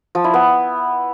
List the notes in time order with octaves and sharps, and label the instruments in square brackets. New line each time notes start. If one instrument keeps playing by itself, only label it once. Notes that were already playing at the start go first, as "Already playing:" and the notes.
[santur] F3
E4
B3